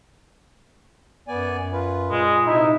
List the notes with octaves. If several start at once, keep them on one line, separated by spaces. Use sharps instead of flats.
F#2 B3 D5 G#5
F4 B4
A#2 G#3
C3 D#4 E4